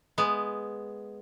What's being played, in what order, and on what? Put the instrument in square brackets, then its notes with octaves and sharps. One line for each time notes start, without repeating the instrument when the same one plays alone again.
[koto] G#3 B3